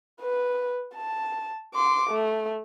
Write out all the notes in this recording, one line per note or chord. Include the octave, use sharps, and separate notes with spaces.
B4
A5
C6 D6
A3